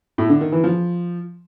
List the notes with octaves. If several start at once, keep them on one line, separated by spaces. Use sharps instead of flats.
A2
D3
D#3
E3
F3